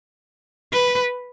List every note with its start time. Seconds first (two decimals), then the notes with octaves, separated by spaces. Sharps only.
0.73 B4